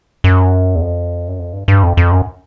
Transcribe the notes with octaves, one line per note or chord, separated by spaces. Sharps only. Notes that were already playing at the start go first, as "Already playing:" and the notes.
F#2
E2
F2
F#2
F2
G2
G2
F2
F2
F#2